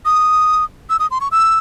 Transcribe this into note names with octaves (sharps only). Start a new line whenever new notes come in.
D#6
E6
D#6
C6
C#6
E6